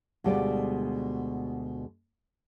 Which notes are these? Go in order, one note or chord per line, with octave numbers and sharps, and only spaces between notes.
D2 B2 G3 G#3 F4 D5